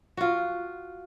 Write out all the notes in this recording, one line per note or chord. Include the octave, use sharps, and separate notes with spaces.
F4 F#4